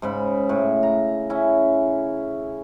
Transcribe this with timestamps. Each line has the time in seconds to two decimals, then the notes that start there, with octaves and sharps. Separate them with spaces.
0.02 G#2 C#3 B5
0.49 A2
0.83 A#5
1.30 C#4 E4